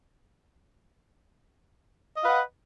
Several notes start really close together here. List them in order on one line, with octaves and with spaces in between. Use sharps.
D#5 F5 B4 F#5